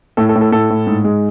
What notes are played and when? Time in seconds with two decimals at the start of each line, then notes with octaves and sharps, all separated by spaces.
0.17 A2 A4
0.29 A4
0.35 A2
0.41 A4
0.52 A2 A4
0.70 A2
0.87 G#2
1.04 G#3